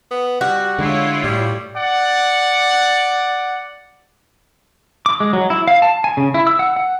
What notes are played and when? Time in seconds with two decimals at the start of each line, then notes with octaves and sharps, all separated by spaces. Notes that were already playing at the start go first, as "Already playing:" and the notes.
0.11 B3
0.41 G3 F#4
0.79 D3 G#3 A3 E4 F4 C#5
1.24 A2 G3
1.76 D5 F#5
5.06 D6
5.20 G#3
5.33 F#3
5.50 E4
5.68 F5
5.82 A5
6.04 G#5
6.17 C#3
6.34 E4
6.47 E6
6.59 F#5
6.76 F#5